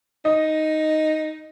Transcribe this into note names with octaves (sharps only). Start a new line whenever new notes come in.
D#4 D#5